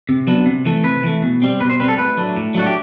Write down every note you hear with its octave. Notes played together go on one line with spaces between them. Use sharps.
C3
F#3 B3 D4
C3
E3 A3
C3 B4
E3 A3
B2
G3 C4
B2 B4
C5
G3 C4 B4
A4
A2 B4
F#3 A3 D4
A2
F#3 A3 D4 F#4
G4